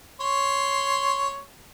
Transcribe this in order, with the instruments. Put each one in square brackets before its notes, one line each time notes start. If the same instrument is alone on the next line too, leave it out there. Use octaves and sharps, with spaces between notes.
[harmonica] C#5 C6